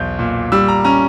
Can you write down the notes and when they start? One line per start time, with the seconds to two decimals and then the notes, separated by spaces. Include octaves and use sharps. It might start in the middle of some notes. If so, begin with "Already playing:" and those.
Already playing: B1 E2 G6
0.19 A#2
0.52 G3 E6
0.68 A#5
0.84 C#4 A#5